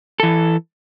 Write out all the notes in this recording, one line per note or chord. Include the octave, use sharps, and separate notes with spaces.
E3 A4